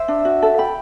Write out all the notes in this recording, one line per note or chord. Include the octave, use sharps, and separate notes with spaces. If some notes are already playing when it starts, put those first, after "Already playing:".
Already playing: C5 E5
D4
F#4
A4
G5 B5